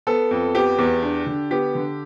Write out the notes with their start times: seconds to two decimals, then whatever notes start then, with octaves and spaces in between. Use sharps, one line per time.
0.07 B3 A4
0.31 F2
0.55 B3 G4
0.79 E2
1.03 D4
1.26 D3
1.51 B3 G4
1.75 D3